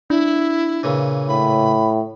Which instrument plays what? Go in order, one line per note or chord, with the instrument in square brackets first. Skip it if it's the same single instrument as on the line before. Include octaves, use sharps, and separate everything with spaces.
[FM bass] D4 [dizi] E4
[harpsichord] A#2 C#3 E3
[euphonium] A2 [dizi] B5